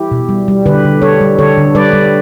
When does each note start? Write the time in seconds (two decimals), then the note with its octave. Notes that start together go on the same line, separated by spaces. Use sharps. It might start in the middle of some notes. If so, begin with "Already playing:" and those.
Already playing: E4 G4
0.11 B2
0.29 G3
0.48 G3
0.66 D3 G4 B4
0.85 D3
1.02 G3 A4 C#5
1.21 G3
1.39 D3 A4 C#5
1.58 D3
1.75 G3 B4 D5
1.93 G3